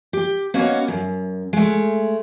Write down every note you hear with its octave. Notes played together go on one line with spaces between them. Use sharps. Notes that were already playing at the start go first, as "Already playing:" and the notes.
G4
A#3 B3 C#4 F#4 C#5 D#5
F#2
G#3 A3